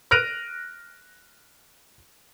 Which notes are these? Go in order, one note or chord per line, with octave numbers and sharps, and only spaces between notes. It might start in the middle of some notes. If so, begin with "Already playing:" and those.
F6 F#6 A#6 D7 D#7 F7